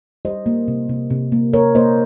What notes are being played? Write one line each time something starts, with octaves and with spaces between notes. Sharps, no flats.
G3 C5 D#5
A#3
C3
C3
C3
A#3
A#3 A#4 C#5
A#3 C5 D#5